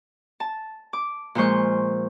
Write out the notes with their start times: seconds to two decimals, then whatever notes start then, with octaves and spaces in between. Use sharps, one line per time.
0.40 A5
0.93 D6
1.35 A#2 F3 G#3 C5 C#6